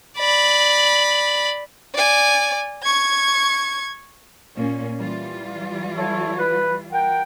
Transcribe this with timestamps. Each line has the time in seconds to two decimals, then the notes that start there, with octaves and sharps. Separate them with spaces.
0.18 D5 B5
1.95 D5 G#5
2.83 C#6 G#6
4.55 A#2 A#3 C#4
4.98 E3 G3 F4
5.97 E4 A4 C#5
6.38 B4
6.92 A#4 F#5 G5